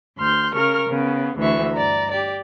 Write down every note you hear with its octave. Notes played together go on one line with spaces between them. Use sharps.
D2 C6 F6 G6
C#3 A#4 C#6 F6
C#3 B3
D2 E3 E5 C#6
G2 D5 A#5
G4 D5